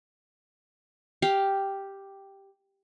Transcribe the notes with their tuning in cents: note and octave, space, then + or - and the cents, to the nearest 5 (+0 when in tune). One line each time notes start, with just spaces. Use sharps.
G4 +0 F5 +0